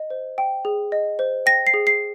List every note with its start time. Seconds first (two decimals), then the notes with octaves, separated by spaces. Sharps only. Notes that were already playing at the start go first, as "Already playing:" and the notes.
Already playing: D#5
0.10 C5
0.38 G5
0.65 G#4
0.92 D#5
1.19 C5
1.46 G5 A#6
1.67 C7
1.74 G#4
1.87 C7